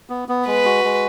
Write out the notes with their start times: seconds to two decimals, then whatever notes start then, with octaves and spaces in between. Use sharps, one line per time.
0.10 B3
0.29 B3
0.47 G#3 B4
0.65 F#4
0.84 G#3